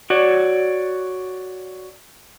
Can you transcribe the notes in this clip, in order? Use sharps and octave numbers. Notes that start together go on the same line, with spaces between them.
F#4 C#5 D5